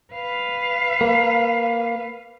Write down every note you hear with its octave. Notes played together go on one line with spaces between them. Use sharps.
B4 F5
A#3